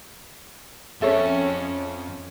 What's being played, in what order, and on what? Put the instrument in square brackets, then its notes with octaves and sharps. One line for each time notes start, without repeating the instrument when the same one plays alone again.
[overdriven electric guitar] F2 [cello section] C#4 [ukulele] A4 C#5 [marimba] E5